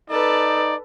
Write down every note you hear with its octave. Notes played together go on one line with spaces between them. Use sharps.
D#4 A4 B4 D5